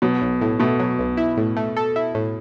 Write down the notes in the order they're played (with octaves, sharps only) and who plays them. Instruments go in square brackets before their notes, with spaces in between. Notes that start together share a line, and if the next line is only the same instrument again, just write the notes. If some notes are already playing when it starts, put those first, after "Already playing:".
[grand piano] B2 [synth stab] F#3
[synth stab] B1
A2
[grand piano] B2 [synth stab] A3
[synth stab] F#3
B1
E4
A2
A3
A4
E4
A2